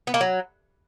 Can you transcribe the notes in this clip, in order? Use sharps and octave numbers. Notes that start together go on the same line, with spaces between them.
B3
A#3
F#3